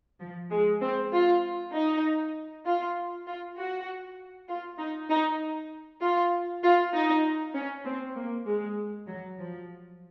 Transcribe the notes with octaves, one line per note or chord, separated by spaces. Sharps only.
F3
G#3
C4
F4
D#4
F4
F4
F#4
F4
D#4
D#4
F4
F4
D#4
C#4
C4
A#3
G#3
F#3
F3